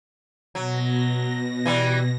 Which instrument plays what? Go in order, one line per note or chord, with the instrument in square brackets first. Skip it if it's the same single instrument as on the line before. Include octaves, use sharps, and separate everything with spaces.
[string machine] B2 A#6 [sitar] F#3
[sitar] E3 G3